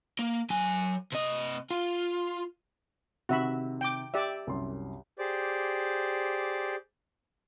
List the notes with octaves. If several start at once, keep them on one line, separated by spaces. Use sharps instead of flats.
A#3
F#3 G#5
C3 D#5
F4
C3 D#3 F#4 E5 B5
G5 D6
G4 D5 E5
C2 F#2 C6
G4 G#4 C5 D5 D6